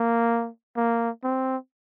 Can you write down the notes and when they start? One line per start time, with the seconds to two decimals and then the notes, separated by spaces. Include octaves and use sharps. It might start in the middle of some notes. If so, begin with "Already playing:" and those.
Already playing: A#3
0.77 A#3
1.23 C4